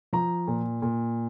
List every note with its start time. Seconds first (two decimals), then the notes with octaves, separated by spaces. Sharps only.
0.13 F3 A#5
0.47 A#2
0.82 A#2